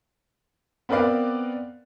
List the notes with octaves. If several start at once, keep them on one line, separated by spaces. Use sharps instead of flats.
B3 C4 A#4 B4 D5 F5